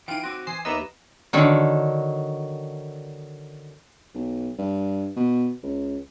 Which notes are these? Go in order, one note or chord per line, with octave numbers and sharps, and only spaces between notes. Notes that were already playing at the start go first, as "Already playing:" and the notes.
E3 D#4 F4 G5 D7 D#7
C4 F#4 C6 D6 E6
E3 C5 G#5 D#6 C7
D#2 B3 D#5 E5 A#5 B5 D6 E6
D3 D#3 F#3
B1
G2
B2
C#2